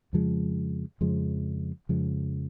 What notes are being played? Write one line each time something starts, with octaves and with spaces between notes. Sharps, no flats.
F2 C#3 F3 G#3
F2 C#3 F3 G#3
F2 C#3 F3 G#3